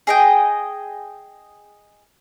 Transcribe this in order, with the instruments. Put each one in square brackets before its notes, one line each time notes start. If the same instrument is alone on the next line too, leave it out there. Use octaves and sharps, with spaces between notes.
[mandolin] G#4 D#5 G5